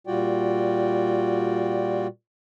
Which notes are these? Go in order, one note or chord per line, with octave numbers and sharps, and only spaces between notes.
A#2 G3 F4 F#4 D5 G5